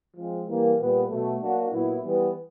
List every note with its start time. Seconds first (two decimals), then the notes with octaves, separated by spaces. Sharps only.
0.15 F3 G#3 C4
0.47 E3 G3 A#3
0.78 A#2 G3 B3
1.09 B2 F#3 A3
1.40 F#3 A#3 D4 F#4
1.71 A#2 F#3 B3 E4
2.03 E3 G3 B3